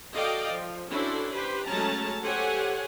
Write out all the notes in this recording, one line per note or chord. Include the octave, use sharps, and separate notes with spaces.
F#4 A4 D5 D#5 F5 G5
F3
C#4 D4 E4 F#4 A4 C5
G4 B4 C5
F#3 G#3 A3 C#4 A5 A#5
G4 A4 C5 C#5 F#5 G#5